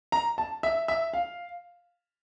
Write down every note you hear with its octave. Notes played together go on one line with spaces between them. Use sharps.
A#5
A5
E5
E5
F5